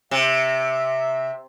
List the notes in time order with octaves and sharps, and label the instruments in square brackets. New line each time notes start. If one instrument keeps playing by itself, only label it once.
[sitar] C3 [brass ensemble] E5